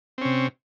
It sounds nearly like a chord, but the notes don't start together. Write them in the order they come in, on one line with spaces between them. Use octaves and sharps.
C4 C#4 C3